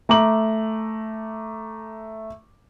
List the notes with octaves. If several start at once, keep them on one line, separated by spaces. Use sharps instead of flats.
A3 A#5 D6 F#7